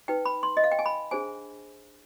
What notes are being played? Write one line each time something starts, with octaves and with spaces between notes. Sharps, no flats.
D#4 B4 G5
B5
C6
D#5
F5
G5
G#5
B5
D4 G#4 C5 G#5